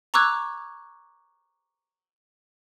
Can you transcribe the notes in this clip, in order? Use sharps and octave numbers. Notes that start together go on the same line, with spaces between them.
A#5 C#6 D6 E6 F#6 G#6